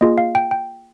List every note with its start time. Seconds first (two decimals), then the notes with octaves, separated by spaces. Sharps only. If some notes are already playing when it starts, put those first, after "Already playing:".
0.01 A#3 F4 G#4 D#5
0.18 F5
0.35 G5
0.51 G5